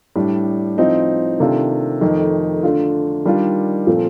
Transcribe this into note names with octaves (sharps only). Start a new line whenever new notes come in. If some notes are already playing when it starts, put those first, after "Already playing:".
A2 G3 D4
A2 F3 C4 D#4
C3 D#3 A3 D4 F4
F2 D#3 A3 D#4
D3 A3 D4 F4
D#3 G3 D4 F4
A#2 F3 A3 C4